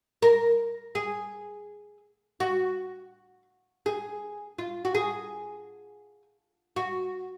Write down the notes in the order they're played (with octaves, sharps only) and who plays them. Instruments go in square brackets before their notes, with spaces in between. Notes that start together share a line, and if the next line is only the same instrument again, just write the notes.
[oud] A#4
G#4
F#4
G#4
F4
F#4
G#4
F#4